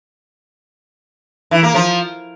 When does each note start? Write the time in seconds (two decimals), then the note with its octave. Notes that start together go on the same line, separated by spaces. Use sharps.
1.51 E3
1.63 A#3
1.75 F3